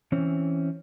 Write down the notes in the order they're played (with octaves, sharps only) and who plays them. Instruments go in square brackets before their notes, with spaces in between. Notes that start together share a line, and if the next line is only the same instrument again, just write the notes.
[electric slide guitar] E3 C4 C#4